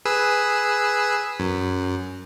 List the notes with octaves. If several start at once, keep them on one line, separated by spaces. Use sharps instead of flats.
G#4 B4 E6
F#2